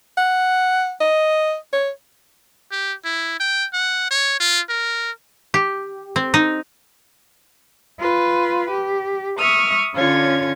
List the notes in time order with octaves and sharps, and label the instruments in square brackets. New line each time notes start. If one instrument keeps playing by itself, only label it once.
[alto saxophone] F#5
D#5
C#5
[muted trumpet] G4
E4
G5
F#5
C#5
F4
A#4
[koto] G4
C4
D#4
[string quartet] F4 B4
G4
E5 C#6 D#6 F6
D3 C#4 F4 C#5 G#6